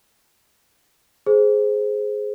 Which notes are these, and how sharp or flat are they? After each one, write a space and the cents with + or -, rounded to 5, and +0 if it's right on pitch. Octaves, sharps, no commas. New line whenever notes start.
G#4 +10 C5 +0